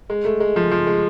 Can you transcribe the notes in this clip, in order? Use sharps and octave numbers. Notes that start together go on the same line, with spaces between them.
G#3
A3
G#3
F3
F3
G#3